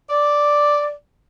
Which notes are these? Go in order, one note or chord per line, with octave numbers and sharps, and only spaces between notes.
D5